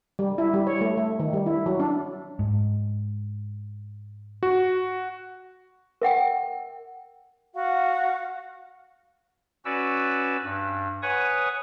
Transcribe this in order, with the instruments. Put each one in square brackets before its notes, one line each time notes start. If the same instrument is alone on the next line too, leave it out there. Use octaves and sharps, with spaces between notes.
[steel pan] G3
E4
G3
C#5
A3
A3
D#3
G3
E4
F#3
D4
[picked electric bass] G#2
[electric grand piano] F#4
[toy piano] A#4 E5 F#5 G5
[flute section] F#4 F5 F#5
[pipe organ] C#4 F#4 B4 D5 E6
G2
B4 C#5 F#5 G#5 C#6 D#6